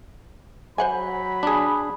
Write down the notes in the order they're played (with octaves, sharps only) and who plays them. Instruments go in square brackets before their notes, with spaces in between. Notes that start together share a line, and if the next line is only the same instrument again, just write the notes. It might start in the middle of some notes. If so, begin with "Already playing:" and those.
[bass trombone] F#3 [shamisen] C5 F#5 G#5 [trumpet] B5
[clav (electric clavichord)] D4 G#4